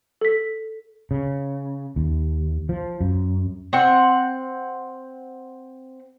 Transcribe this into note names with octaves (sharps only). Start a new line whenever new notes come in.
A4 B6
C#3
D#2
F3
F#2
C4 F#5